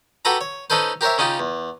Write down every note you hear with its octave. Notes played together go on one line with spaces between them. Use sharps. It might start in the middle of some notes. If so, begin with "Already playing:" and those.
F#4 G4 A4 B4 A#5
C#5
C#4 D#4 A4 B4 C5
G4 A#4 C5 C#5 E5
C#3 C#4 D#4 F4 G4
E2